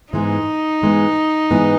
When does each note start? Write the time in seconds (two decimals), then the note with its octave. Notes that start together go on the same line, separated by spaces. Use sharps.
0.13 G#2 E3 G#3 B3 D#4
0.81 G#2 E3 G#3 B3
1.51 G#2 E3 G#3 B3